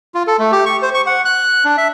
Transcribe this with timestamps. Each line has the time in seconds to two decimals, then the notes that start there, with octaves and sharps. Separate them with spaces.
0.15 F4
0.27 A4
0.39 A3
0.52 G4
0.66 C#6
0.82 C5
0.94 C#6
1.06 F#5
1.25 F#6
1.65 D4
1.78 E5